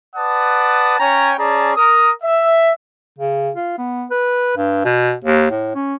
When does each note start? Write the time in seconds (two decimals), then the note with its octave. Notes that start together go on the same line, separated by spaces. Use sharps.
0.16 B4 D5 F#5 A5 D#6
0.99 C#4 C#5 G5 G#5 A#5
1.39 C#4 G#4 D5 A5 A#5
1.77 A#4 D#6
2.23 E5
3.19 C#3
3.56 F4
3.78 B3
4.11 B4
4.57 G2
4.84 B2
5.24 D#2
5.51 A2
5.75 C#4